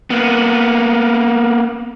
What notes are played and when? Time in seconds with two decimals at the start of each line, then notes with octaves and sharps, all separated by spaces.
0.10 A#3 B3